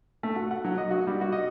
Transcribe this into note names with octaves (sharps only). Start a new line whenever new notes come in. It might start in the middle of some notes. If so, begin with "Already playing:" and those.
A3
F#4
F#5
F#3
D#5
F#4
G3
F#4
D#5